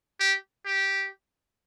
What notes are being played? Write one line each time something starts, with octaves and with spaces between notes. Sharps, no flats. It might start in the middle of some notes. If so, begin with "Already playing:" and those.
G4
G4